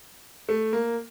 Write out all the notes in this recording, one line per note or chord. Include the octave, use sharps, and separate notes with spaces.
A3
A#3